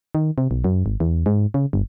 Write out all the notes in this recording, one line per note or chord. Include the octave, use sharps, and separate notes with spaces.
D#3
C3
B1
F#2
G#1
E2
G#2
C#3
G1